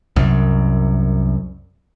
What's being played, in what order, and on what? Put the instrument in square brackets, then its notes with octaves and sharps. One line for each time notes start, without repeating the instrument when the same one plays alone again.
[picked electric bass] C2 F#2